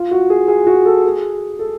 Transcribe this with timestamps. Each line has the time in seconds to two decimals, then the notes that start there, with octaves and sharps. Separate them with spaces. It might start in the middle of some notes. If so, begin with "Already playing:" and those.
Already playing: F4
0.11 F#4
0.30 G#4
0.48 G#4
0.67 F#4
0.85 A4
1.04 G#4
1.59 A4